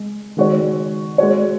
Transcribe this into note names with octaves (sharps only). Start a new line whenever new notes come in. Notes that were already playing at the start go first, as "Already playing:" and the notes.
Already playing: G#3
D#3 G#3 F#4 C#5
G#3 F#4 C#5